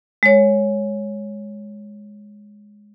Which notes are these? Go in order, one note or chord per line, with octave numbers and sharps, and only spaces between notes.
G#3 C#5